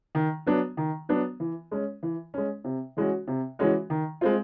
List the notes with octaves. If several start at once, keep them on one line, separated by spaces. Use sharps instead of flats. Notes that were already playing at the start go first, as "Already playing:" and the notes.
D#3
F#3 B3 D4
D#3
F#3 B3 D4
E3
G#3 C#4
E3
G#3 C#4
C3
E3 G#3 C#4 F#4
C3
E3 G#3 C#4 F#4
D#3
G#3 C4 F4